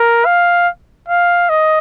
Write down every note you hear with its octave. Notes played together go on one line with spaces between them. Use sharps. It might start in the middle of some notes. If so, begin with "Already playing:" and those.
Already playing: A#4
F5
F5
D#5